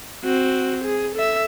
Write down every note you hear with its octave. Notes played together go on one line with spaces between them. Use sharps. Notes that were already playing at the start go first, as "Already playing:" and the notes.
C4 F#4
G#4
A4 E5